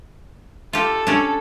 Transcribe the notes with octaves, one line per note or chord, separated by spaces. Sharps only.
F4 G4 A4
C#4 D4